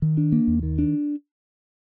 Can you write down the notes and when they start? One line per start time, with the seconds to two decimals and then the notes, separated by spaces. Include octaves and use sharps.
0.02 D#3
0.17 D4
0.32 A#3
0.48 D#2
0.63 D#3
0.79 D4